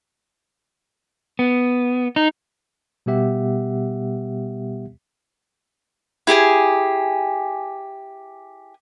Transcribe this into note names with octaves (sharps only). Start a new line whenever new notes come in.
B3
D#4
B2 G3 B3 G4 E5 F#5
E4 G4 G#4 G#5